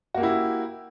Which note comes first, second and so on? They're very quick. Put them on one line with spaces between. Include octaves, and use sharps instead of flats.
F#4 A#3 G4 E4